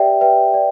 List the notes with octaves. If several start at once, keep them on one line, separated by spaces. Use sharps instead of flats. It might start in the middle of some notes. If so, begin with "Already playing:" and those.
Already playing: G4 B4 D5 E5 G5
B4 E5 G5
D5